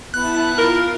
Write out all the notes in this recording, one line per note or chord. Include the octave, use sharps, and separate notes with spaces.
B3 E4 E5 A5 F#6
F4 A#4